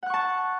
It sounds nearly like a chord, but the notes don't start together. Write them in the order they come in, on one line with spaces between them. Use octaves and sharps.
F#5 F#6 C#6 A5